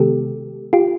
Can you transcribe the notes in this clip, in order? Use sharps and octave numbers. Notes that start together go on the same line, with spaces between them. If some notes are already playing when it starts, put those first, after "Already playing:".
Already playing: C3 D#3 G#3 B3 G4 A4
F4 G4